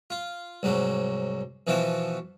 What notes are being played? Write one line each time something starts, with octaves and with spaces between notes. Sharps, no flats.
F4
C2 G#2 F#3
B2 E3 F3 E4 F#4